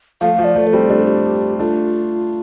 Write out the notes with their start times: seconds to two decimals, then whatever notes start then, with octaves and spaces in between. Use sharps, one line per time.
0.21 F3 A3 F5
0.39 F3
0.44 D5
0.56 F3 A3
0.67 A4
0.73 G3 C4
0.90 A3 D4 G4
1.00 A4
1.07 G4
1.59 A3 D4 F4